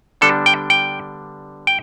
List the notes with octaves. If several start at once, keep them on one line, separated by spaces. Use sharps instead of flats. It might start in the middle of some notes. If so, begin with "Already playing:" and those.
D3 G3 B3 D4 A4
G5
G5
G5